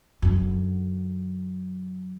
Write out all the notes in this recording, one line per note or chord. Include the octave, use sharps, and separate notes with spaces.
F#2 D3